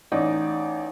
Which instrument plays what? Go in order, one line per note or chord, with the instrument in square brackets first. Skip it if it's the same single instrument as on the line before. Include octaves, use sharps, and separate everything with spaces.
[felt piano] A1 D#4 D5